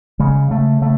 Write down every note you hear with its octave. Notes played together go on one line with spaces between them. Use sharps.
C#3 G#3
C#3 A3
C#3 A3